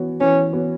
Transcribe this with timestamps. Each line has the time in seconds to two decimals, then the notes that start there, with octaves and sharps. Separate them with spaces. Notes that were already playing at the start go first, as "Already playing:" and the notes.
Already playing: E3 B3 F#4 C#5
0.20 E3 C#4
0.53 B3 F#4 C#5